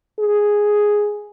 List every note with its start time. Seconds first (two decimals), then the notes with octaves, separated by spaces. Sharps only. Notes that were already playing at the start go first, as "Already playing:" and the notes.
0.19 G#4